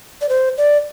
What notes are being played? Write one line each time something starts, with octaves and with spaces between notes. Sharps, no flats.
D5
C5
D5